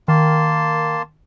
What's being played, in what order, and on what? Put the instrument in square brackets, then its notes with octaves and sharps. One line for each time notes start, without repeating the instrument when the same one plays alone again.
[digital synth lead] D#3 [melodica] A#3 A5 C6